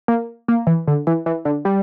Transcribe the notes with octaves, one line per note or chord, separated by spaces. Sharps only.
A#3
A#3
E3
D3
E3
E3
D3
G3